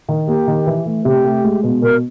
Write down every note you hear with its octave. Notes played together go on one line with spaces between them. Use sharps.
D#3
A#3 G4
D#3
E3
A3
C3 G4
A3
G#3
B2
B2 A#4